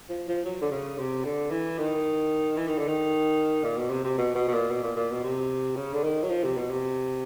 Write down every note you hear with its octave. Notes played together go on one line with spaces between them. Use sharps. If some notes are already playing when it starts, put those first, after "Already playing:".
F3
F3
F#3
D3
C#3
C3
D3
E3
D#3
E3
D#3
D3
D#3
A#2
B2
C3
C3
B2
B2
B2
A#2
B2
A#2
A#2
B2
C3
C#3
D3
D#3
F#3
F3
C3
B2
C3